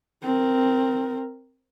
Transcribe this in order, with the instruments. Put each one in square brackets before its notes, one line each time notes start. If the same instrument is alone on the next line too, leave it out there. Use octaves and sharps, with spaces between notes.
[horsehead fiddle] C4 A#4